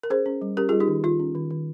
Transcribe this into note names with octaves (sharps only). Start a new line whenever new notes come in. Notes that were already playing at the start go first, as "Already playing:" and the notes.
A#4
C#4 G#4 C5
C#4
G3
C#4 G4 A#4
F4 G#4
G3
D#4 G4
D#3
D#3 F4
C#4
D#3
D#3